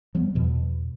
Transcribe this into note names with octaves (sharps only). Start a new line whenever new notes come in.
F3 G3 B3
E2 B2